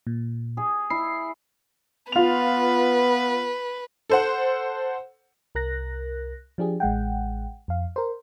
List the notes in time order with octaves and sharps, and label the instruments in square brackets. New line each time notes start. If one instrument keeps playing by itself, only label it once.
[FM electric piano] A#2
[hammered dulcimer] G#4
[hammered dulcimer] E4 [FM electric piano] C7
[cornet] B3 [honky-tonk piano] F4 F7 [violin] B4
[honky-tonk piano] A4 C5 F#5
[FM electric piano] C2 A#4 F#6 A#6
F3 D4 G4 G#4
A1 G#3 F#5 G5
F2 F5
A#4 C5